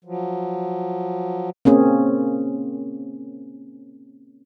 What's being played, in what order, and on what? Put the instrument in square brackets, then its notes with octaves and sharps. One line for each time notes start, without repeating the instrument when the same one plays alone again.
[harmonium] F3 F#3
[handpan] A#3 C4 C#4 G#4